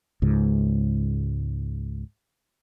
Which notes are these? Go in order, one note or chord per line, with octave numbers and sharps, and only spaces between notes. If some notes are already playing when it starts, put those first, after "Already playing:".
C#2 G#2